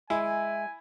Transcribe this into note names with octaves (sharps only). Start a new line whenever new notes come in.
G#3 E4 E5 G#5